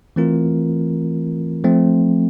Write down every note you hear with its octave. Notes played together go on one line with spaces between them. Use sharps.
E3 A3 C4 F4 A#4
F3 A3 C4